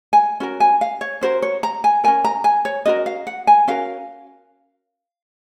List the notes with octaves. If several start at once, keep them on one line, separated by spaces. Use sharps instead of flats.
G#5
C#4 F#4 A#4
G#5
F5
C#5
C#4 F#4 A#4 C5
C#5
A#5
G#5
C#4 F#4 A#4 G#5
A#5
G#5
C#5
C#4 F#4 A#4 D#5
F5
F#5
G#5
C#4 F#4 A#4 F5